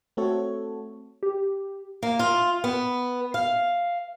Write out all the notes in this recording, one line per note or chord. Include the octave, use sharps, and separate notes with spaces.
A3 C4 F#4 A4 C#5
G4
A#3
F4
B3
F5